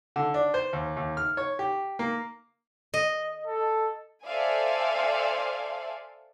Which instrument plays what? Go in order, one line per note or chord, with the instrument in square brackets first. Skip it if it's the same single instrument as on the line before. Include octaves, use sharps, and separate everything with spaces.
[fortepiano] D3
D4
C5
D#2
D#2
F6
C#5
G4
A#3
[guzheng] D#5
[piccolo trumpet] A4
[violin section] A4 C5 D5 E5 F5 G#5